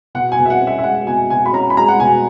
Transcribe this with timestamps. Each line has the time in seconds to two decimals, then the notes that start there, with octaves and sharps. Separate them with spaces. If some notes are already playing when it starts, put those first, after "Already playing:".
0.15 B2 F#5
0.32 G#5
0.39 B2
0.45 E5
0.50 F#5
0.61 C#4
0.67 E5
0.78 E5
0.84 G#3 F#5
1.07 B2 G#5
1.30 B2 G#5
1.46 B5
1.53 C#4 A#5
1.70 B5
1.77 G#3 A#5
1.88 F#5
2.00 B2 G#5